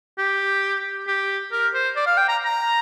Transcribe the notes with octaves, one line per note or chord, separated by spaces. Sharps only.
G4
G4
A#4
C5
D5
F5
G5
A#5
A#5